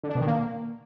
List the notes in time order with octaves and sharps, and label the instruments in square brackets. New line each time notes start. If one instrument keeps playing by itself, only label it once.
[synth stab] D3
D4
B2
D#3
A#3